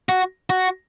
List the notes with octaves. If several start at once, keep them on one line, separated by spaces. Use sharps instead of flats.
F#4
F#4